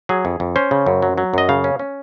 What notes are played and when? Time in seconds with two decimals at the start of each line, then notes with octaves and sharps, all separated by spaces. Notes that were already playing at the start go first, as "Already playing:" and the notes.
0.09 F#3 G#4
0.25 F2
0.40 F2
0.56 C#4 C5
0.71 C#3
0.86 F#2
1.02 F#3
1.18 F#3
1.34 F#2 D#5
1.49 C#3 F5
1.64 C#4
1.79 C#4